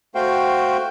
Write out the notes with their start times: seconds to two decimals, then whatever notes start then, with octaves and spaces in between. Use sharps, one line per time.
0.15 A3 F#4 C5 F5 G5